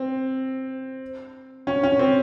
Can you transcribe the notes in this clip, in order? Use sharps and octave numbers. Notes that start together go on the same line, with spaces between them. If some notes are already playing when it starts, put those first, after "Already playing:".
Already playing: C4
C#4
C#4
C4